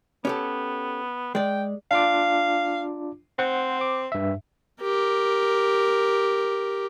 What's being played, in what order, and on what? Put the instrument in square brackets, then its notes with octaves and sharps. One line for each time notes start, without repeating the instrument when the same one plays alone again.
[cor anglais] B3 [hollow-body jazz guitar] C#4 G4 A4
[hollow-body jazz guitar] G#3 D5 [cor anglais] G5
[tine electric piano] D4 F4 D6 [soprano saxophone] F5
[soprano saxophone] C4 [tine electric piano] C5 F#5
[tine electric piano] D6
G2 E5
[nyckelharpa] G4 A#4